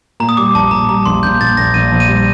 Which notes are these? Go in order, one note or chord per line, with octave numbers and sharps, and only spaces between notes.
A#2 A#5
D#6
G3 D6
A#1 A5
A#2 A#5
G3 A#5
A#1 C6
A#1 G6
A#2 A6
A#1 A#6
A#1 D#7
A#1
D#7
G3